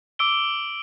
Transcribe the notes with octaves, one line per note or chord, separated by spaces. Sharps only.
D6 E6 D7 G7